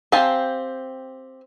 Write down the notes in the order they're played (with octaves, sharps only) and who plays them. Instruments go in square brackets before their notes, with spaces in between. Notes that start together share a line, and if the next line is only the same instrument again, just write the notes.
[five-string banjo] C4 G4 F5 G#5 A5